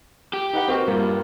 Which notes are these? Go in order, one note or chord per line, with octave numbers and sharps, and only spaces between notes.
G4
D#4 B4 F#5
C4 F#4 A#4
G2 A#3 F4